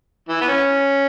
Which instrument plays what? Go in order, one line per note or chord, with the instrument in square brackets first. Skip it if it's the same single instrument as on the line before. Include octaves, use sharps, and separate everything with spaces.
[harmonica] E3
B3
C#4